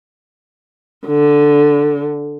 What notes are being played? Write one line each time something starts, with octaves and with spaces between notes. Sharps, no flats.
D3